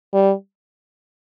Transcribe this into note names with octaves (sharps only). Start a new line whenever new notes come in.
G3